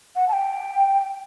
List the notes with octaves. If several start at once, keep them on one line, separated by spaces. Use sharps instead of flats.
F#5
A5
G5